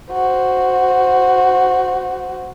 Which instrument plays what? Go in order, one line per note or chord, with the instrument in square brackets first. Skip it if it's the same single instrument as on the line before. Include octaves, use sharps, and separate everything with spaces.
[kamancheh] F#4 C5